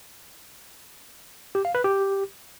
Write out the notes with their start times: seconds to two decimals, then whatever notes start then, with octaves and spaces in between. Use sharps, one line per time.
1.55 G4
1.65 F5
1.75 B4
1.84 G4